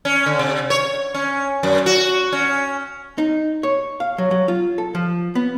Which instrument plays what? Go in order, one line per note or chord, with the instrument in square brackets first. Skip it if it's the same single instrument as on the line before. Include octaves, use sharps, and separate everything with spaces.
[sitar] C#4
D3
C3
C#5
C#4
F#2
F#4
C#4
[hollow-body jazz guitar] D#4
C#5
F5
F#3
F#3
F4
A4
F3
B3